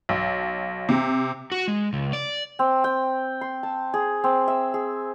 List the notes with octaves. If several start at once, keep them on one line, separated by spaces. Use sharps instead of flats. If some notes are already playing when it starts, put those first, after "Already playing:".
B1
C3
F#4
G#3
C#2
D5
C4
G5
C6
A5
G#4
C4
E5
G#4